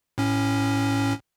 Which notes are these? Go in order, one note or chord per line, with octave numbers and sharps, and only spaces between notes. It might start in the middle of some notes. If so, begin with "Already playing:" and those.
A2 C#4